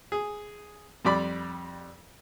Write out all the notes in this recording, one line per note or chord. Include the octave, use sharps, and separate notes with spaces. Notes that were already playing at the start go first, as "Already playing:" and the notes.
G#4
F2 G3 D5 B5